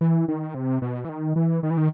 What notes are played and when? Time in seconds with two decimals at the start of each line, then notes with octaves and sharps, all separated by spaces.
0.01 E3
0.28 D#3
0.54 C3
0.82 B2
1.04 E3
1.09 D#3
1.36 E3
1.63 D#3
1.70 E3
1.77 D#3